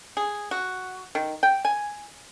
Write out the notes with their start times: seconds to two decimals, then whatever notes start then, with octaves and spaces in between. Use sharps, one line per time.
0.17 G#4
0.51 F#4
1.15 D#3
1.43 G5
1.65 G#5